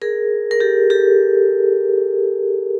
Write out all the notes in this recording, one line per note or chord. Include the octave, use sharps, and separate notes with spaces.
G#4 A#4
A#4
G4 A4
G4 A4